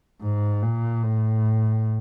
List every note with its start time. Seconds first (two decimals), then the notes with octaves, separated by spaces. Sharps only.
0.22 G#2
0.62 A#2
1.03 A2